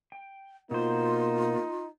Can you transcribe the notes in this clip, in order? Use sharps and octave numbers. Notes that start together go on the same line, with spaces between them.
G5
B2 A#3 D#4 F4 C5